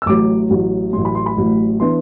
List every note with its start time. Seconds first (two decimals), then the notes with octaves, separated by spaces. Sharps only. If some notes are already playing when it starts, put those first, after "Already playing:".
0.02 E6
0.06 A1 A2 F#3 D6
0.50 A1 A2 F#3
0.93 A1 A2 F#3 C6
1.05 B5
1.15 C6
1.26 B5
1.37 A1 A2 F#3
1.80 E3 B3 D4 C6